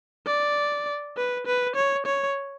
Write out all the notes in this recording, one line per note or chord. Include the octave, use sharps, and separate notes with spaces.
D5
B4
B4
C#5
C#5